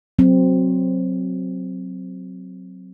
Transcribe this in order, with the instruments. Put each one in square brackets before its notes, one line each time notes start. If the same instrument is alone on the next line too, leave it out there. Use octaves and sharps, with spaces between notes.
[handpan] F#3 C4